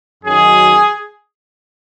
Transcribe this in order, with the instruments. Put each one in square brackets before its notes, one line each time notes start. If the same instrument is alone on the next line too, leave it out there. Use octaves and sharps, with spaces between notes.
[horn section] F#2 D#3 F#3 G#4